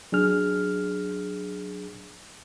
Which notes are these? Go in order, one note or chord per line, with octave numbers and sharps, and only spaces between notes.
F#3 D4 G#4 F6